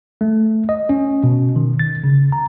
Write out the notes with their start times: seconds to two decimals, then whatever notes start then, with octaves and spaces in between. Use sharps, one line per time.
0.21 A3
0.69 D#5
0.89 C#4
1.23 B2
1.56 D#3
1.79 A6
2.04 C#3
2.32 A#5